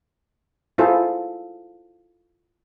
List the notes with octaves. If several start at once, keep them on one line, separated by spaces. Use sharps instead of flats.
E4 F4 G#4 A4 C5